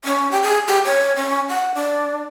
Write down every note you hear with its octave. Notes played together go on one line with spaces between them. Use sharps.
C#4
G4
G#4
G4
C#5
C#4
F#5
D4